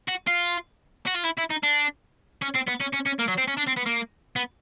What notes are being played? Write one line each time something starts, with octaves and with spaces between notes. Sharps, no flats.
F#4
F4
F#4
F4
E4
E4
D#4
D4
C#4
C4
B3
C#4
C#4
C#4
A#3
F#3
C4
C#4
D4
C4
B3
A#3
B3